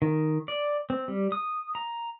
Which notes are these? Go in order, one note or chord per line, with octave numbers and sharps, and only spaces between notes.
D#3
D5
C4
G3
D#6
A#5